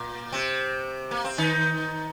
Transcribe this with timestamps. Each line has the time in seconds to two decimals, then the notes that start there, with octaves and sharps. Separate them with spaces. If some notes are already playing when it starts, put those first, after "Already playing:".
Already playing: A#2 A#3
0.32 C3 C4
1.11 A#3
1.24 C4
1.38 D#3 D#4